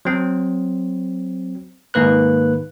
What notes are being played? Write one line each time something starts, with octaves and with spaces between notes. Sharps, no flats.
F#3 C4
G#2 D#3 A#3 B4 F#6